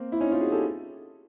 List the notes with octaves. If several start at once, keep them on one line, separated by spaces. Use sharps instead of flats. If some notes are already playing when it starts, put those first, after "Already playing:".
Already playing: A#3 C4
E4
C#4 D#4
D#4 F4
F#4 G#4
G4 A4